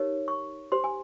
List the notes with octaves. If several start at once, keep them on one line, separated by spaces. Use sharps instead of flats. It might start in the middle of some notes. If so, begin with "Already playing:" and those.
Already playing: D#4 G4 A#4 C#5
C#6
G4 C5 C6
G#5